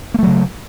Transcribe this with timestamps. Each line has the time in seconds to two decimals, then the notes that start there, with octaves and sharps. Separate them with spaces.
0.14 A#3
0.19 A3
0.23 F#3
0.27 C#3